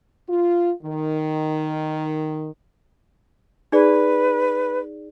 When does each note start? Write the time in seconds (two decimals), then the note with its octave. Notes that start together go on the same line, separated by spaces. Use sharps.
0.27 F4
0.82 D#3
3.72 D#4 G#4 B4 D5